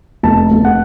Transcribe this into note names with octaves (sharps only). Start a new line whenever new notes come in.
F1 A5
F1
F#5